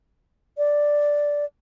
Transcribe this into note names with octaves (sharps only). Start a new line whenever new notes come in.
D5